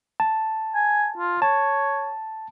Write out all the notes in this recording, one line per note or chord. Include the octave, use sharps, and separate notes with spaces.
A5
G#5
F4
C#5 A5